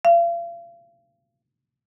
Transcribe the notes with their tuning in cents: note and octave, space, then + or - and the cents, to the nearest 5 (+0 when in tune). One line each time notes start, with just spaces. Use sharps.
F5 -40